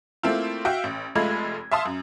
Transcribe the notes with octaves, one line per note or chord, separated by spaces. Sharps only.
A3 A#3 C4 E4 F4
F#4 E5 F5 G5
A1
F1 G#3 A3 F4 B5 G#6
E5 F5 A5 C6 D#6
F#2